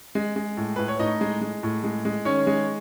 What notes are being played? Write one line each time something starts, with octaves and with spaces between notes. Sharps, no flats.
G#3
G#3
A2
A2 B4
C#5
A2 D#4 D#5
G#3
G#3
A2
G#3
G#3
D#3 C#4 C#5
G#3